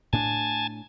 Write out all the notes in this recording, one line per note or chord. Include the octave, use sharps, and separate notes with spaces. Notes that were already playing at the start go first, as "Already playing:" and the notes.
A2 D4 G#5 A5